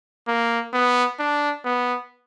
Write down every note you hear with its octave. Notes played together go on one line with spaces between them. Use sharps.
A#3
B3
D4
B3